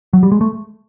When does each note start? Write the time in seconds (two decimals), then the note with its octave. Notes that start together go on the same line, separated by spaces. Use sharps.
0.13 F#3
0.23 G3
0.32 G#3
0.41 A3